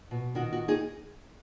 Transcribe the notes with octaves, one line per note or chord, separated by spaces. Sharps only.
B2
D#3 F#4
F#4
D#4 G#4